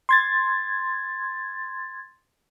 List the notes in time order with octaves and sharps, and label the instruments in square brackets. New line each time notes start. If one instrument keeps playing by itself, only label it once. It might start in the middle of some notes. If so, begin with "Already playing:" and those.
[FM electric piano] C6 G#6 A6